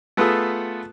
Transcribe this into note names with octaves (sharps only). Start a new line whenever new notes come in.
A3 B3 F4 G#4 A4